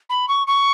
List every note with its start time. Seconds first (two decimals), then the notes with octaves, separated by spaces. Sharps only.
0.09 B5
0.28 C#6
0.47 C#6